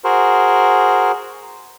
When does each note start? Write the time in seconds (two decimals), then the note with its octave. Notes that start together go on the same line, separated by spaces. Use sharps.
0.04 F#4 G#4 A#4 C5